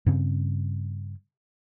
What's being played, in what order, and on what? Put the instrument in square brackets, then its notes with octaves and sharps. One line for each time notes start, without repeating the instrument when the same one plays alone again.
[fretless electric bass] G2 C#3 C4